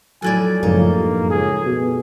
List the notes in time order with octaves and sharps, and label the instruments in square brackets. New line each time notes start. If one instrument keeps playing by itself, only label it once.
[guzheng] F2 A2 D5 [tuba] F#3 [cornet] G#5
[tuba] C#2 [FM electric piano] F#2 A2 F3 [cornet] A#3 [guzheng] D#4
[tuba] G2
[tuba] C#2 [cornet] G#4
[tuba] B2